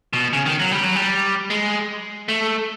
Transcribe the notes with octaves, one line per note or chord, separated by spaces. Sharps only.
B2
C#3
D#3
F#3
G3
F#3
G3
G#3
A3